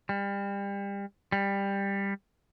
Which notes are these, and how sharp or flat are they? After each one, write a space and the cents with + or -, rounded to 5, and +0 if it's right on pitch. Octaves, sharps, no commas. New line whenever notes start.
G3 +30
G3 +15